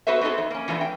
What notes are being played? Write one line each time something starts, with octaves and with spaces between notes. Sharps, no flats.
B3 F#4 A4 B4 C5 E5
B3 C4 D#4 G#4 A4 C5
F2
A#3 C#4
E3 F3 A3 B3 D4
G5